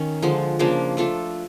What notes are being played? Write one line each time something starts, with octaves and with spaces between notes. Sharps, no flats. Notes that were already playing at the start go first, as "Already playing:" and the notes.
Already playing: D#3 C#4
D3 F3 G#3
C#3 F3 A#3 D4
A3 D4 F4 A4